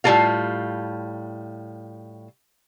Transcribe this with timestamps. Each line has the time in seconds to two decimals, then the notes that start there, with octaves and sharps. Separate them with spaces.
0.04 A2 G3 A#3 F4 A4 F5